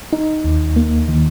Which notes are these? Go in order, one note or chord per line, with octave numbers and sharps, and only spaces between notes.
D#4
D#2
A#3
D#3